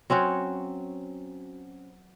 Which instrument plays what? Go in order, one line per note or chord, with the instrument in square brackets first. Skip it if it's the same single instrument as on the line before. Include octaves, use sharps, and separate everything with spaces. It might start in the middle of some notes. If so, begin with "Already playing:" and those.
[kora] F#3 C4 C#4 F#4